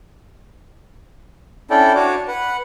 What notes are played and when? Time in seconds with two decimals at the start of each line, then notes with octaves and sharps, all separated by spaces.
1.70 C#4 D4 E4 A4 D5 G5
1.95 D4 F#4 C#5 D6
2.28 B4 F#5